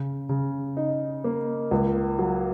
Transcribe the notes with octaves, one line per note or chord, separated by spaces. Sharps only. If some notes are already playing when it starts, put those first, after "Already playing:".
Already playing: C#3
C#3
D#4
A#3
C#2
F#3